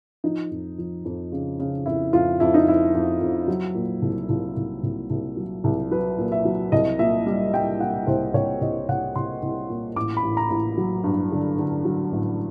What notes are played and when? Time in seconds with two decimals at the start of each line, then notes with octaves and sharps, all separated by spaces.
0.24 F3 D#4
0.51 F2
0.78 F3
1.05 F2
1.32 C#3
1.59 C#3
1.86 F2 E4
2.13 F2 F4
2.40 F2 E4
2.54 D#4
2.67 F2 E4
2.95 F2
3.21 F2
3.48 F#3
3.75 A#2
4.02 C2
4.29 C2 F4
4.57 C2
4.83 C2
5.10 C2
5.37 F#3
5.64 C2
5.91 F#3 B4
6.18 A#2
6.32 E5
6.45 F#3
6.72 C2 D#5
6.99 A#2 E5
7.26 G3
7.54 G3 G5
7.80 A#2 F#5
8.07 C2 C5
8.34 C2 C#5
8.61 C2 D#5
8.88 C2 F#5
9.15 C2 C6
9.42 C2
9.69 A#2
9.96 A1 D6
10.17 B5
10.23 A1
10.37 A#5
10.50 A1
10.77 F#3
11.04 G2
11.32 D3
11.59 D3
11.85 F#3
12.12 A1